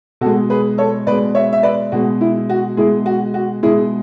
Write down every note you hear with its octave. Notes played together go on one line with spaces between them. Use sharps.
B2 G#3 F#4 A4
G#4 B4
A4 C#5
B2 G#3 B4 D5
C#5 E5
E5
B4 D5
B2 G#3 F#4
E4
F#4
B2 G#3 E4 G#4
F#4
F#4
B2 G#3 E4 G#4